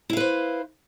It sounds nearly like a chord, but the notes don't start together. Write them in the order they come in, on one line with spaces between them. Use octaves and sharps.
E4 F5 B4 C5